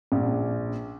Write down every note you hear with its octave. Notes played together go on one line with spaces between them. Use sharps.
A#1